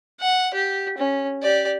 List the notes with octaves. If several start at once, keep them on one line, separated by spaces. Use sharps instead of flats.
F#5
G4
C#4
G4 D5